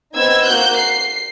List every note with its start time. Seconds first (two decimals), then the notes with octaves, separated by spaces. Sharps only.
0.14 B3 C4 D#4 E6 G#6
0.45 A#3 F#4 F#6 G6
0.74 C7